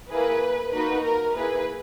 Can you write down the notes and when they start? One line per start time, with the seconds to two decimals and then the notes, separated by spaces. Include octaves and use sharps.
0.11 A#3 E4 G#4 B4
0.73 A#3 D#4 F#4 B4
1.04 A#4
1.35 A#3 E4 G#4 B4